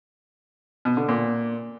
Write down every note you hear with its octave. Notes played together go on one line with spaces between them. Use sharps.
B2
D3
A#2